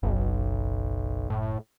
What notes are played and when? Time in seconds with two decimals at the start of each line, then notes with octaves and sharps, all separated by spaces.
0.03 F#1 B1
1.30 A2